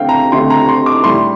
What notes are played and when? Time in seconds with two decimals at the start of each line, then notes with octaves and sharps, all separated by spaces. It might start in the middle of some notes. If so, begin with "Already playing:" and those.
Already playing: D3 A3 C4 F5 G5
0.09 A#5
0.32 D3 A3 C4 C6
0.50 A#5
0.69 C6
0.86 D6
1.03 A2 G3 D4 C6